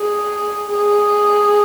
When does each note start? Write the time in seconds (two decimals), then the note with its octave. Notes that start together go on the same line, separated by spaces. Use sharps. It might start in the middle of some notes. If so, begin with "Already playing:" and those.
Already playing: G#4
0.70 G#4